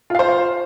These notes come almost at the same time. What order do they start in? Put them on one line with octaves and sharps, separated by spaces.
F4 F5 C5